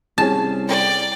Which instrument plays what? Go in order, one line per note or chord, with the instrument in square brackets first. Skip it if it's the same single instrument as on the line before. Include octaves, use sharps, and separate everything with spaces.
[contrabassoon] C2 [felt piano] C#4 G#4 [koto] A5
[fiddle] D5 G5